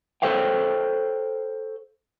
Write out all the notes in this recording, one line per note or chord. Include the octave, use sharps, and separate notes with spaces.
A4 C5 C#5 F5 G5